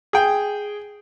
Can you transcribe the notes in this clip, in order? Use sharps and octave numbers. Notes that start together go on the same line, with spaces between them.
G#4 G5